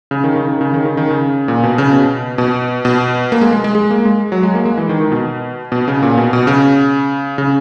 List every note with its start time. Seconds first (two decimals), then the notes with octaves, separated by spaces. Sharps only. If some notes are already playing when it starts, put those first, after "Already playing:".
0.11 C#3
0.24 D#3
0.36 C#3
0.48 D#3
0.61 C#3
0.74 D#3
0.85 C#3
0.97 D#3
1.10 C#3
1.48 A#2
1.63 B2
1.78 C#3
1.93 B2
2.38 B2
2.85 B2
3.32 A#3
3.41 G#3
3.53 G#3
3.64 G#3
3.75 G#3
3.91 A#3
4.05 G#3
4.32 F#3
4.43 G#3
4.55 A#3
4.65 G#3
4.77 E3
4.89 D#3
5.00 D#3
5.12 B2
5.72 B2
5.88 C#3
6.03 A#2
6.18 B2
6.33 B2
6.47 C#3
7.38 C#3